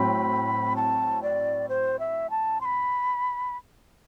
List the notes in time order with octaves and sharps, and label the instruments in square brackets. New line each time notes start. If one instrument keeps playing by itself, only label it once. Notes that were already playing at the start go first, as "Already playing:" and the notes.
Already playing: [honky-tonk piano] A2 F#3 C4 [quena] B5
[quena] A5
D5
C5
E5
A5
C6
B5